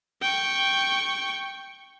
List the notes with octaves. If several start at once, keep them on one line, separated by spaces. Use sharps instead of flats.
G5 C#6